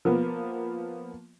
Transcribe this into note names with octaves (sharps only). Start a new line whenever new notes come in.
F3 A#3 B3